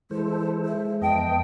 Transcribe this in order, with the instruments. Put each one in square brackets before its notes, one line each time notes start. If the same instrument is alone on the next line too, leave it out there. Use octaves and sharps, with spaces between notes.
[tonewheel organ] E3 A4 C5 [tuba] G#3 [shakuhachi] E4
[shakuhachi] E5
[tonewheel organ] F2 B3 D#5 [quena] G5 [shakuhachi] A5